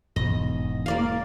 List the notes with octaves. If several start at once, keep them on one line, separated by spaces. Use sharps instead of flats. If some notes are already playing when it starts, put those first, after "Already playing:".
E1 G#2 D#5
A#3 D5 F5